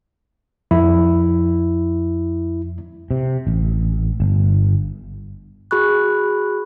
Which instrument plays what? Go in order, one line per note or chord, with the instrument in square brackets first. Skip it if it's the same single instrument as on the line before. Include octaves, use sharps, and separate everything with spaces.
[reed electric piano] F2 [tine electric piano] E4
[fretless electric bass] C3
A1
G1
[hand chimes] F#4 G#4 B5 C#6 F#6